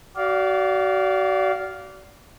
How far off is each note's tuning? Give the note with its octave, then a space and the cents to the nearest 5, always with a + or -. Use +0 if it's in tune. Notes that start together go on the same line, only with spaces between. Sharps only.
F#4 +35 D5 -20 F5 +0